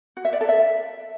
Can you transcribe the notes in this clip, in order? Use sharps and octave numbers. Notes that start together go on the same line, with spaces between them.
F#4
E5
D5
A4
E5